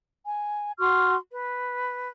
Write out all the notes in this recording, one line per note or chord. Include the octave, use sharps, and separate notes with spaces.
G#5
F#4 C6 C#6 F6
B4